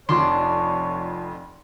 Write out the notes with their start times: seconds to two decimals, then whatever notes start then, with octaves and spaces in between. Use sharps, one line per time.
0.09 F1 F2 D4 C#5 C6